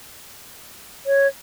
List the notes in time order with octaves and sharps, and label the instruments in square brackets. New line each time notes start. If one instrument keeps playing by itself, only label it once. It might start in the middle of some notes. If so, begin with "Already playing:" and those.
[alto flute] C#5